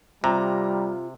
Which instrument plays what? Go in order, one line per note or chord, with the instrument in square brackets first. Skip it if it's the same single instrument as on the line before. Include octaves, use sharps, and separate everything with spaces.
[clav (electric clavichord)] C3 [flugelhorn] G3 [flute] F4 [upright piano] A#5